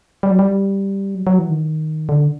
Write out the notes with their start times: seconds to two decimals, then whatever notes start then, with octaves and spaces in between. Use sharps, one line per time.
0.23 G3
0.31 F#3
0.39 G3
1.15 F#3
1.27 F#3
1.39 E3
1.50 D#3
2.09 D3